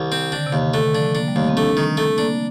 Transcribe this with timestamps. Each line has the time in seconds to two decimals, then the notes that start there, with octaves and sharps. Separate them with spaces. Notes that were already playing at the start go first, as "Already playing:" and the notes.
Already playing: C2 D#3
0.12 C4
0.32 D3 D4
0.46 C3
0.53 D#2
0.60 D#3
0.74 D3 A3
0.94 F3 D4
1.15 A#3 D4
1.28 G3
1.36 D#2 A3
1.49 C4
1.57 A3 D4
1.77 D#3
1.97 A3
2.18 A#3 D4